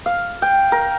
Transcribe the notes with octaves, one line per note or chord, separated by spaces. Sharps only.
F5
G5
A#4